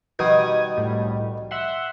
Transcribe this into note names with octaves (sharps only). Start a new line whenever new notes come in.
B2 D#3 G3 D#6 G#6
C2 A2 G3
E5 F#5 C6